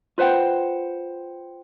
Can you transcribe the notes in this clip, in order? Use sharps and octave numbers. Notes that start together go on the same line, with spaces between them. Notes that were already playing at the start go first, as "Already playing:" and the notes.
F4 B4 C5 F#5 G5